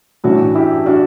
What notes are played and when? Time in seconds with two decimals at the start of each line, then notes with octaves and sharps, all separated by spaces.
0.24 A2 E3 D4 F#4
0.55 E4 G4
0.86 D4 F#4